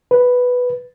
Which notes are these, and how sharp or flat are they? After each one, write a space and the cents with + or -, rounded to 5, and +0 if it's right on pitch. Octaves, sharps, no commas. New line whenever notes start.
B4 +0